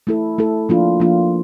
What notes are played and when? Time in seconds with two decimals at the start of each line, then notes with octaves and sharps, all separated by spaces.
0.07 A3 E4 A4
0.38 A3 E4 A4
0.69 F3 A#3 D4 F4
1.00 F3 A#3 D4 F4